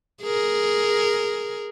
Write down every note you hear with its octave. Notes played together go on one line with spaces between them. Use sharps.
G#4 A#4